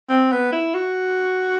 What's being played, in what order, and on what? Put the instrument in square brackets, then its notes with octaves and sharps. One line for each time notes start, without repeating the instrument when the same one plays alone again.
[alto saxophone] C4
B3
E4
F#4